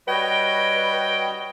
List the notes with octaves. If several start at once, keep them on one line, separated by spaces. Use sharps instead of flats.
G3 F#4 B4 C#5 D#5 G5